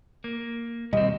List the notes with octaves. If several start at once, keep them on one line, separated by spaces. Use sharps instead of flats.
A#3
D#2 B2 G3 C4 D#5